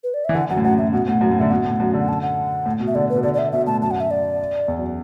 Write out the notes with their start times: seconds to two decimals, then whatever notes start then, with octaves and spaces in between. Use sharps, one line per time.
0.04 B4
0.14 D5
0.25 E3 E5
0.35 D3 F#5
0.50 F#2 F#5
0.57 A2
0.64 F#2 F#5
0.78 A2 E5
0.93 B2 F#5
1.07 A2 F#5
1.21 F#2
1.31 A2
1.39 D3 E5
1.50 B2 F#5
1.65 A2
1.80 F#2
1.94 D3
2.00 F#5
2.09 A5
2.22 F#5
2.66 A2
2.80 B2
2.87 E5
2.95 D3 D5
3.10 B4
3.15 B2
3.23 D3 D5
3.34 D5
3.38 E5
3.52 B2 E5
3.66 A2 A5
3.82 F#2 A5
3.91 F#5
4.00 E5
4.11 D5
4.68 E2
4.78 F#2